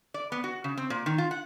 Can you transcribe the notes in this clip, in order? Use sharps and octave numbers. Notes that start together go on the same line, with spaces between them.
D5
B3
F#4
C#3
C4
A#2
D#3
F4
F#5